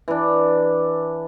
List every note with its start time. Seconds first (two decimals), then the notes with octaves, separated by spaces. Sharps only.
0.08 E3 D4